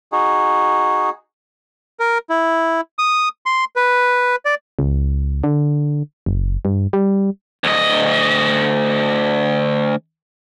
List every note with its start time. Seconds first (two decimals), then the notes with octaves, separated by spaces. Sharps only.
0.12 D#4 F#4 G#4
2.00 A#4
2.30 E4
2.99 D#6
3.46 C6
3.76 B4
4.45 D5
4.79 C#2
5.44 D3
6.26 F#1
6.65 G2
6.93 G3
7.64 D2 D#5